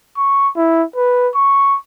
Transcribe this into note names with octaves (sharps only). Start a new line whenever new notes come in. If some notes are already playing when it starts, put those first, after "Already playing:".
C#6
E4
B4
C#6